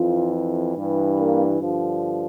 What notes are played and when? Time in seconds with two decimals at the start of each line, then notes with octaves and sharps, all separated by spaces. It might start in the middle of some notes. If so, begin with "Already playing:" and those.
Already playing: F2 E3 F4
0.75 G2 E3
1.18 A#3
1.60 G2 D3 F3